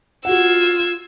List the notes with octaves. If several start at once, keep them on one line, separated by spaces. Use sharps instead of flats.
F4 F#4 F#5 E6 G#6